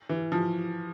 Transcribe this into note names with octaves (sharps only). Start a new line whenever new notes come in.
E3
F3